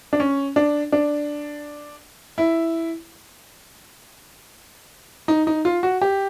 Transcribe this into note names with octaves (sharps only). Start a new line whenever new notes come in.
D4
C#4
D4
D4
E4
D#4
D#4
F4
F#4
G4